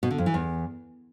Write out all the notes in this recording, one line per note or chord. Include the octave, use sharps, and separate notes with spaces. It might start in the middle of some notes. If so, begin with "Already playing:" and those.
B2
D3
F2
E3
E2